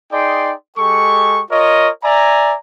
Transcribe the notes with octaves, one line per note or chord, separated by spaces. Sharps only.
D#4 G#4 D5 G5 C6
G#3 G4 A4 C#6
F4 A#4 C#5 D#5
D5 E5 G#5 A#5